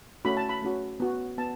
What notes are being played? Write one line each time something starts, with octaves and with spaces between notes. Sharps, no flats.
A3 C#4 F#4 B5
A5
B5
A3 C#4 F#4
B3 F#4
B3 A5